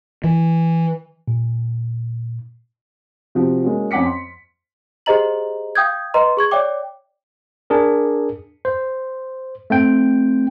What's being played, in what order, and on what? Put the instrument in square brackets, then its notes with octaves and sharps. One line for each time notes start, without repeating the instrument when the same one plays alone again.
[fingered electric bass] E3
[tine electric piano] A#2
[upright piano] C3 F3 F#4
G#3 A#3 C#4 F#4
F2 C#4 F#5 D6 B6 C#7
C6
[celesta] G4 G#4 C5 D#5 A#5 F#7
F5 G5 D#6 G6 G#6
B4 D#5 A#5 C6
G#4 C#6 G#6
C#5 D5 E5 G5 D6
[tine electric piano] D4 G#4 A#4
C5
A3 C4 G5